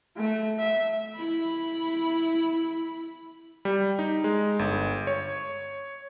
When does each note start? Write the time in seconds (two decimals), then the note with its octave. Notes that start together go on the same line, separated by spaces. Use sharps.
0.17 A3
0.59 E5
1.17 E4 B5
3.65 G3
3.99 D#4
4.24 G#3
4.59 G1
5.07 C#5